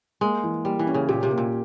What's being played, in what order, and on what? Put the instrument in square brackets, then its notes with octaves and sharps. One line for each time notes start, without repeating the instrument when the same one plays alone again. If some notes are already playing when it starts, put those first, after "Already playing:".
[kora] G#3 [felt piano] A#3
[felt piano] E3
[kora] G3 [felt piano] A#3
[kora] E3
[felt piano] C#4
[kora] C#3
[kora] A#2 [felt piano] G4
[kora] C3
[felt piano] A#3
[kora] A#2